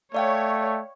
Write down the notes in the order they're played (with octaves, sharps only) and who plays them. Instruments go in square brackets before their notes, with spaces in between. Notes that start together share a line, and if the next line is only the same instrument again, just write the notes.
[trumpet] A3 [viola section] C#5 [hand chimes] D5 F5 G5